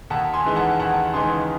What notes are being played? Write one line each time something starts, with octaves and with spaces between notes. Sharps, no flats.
D#2 F#5 A5
G#5 C6
C#3 E3 G#3 D#4
F#5 A5
D#2 F#5 A5
C#3 E3 G#3 D#4 G#5 C6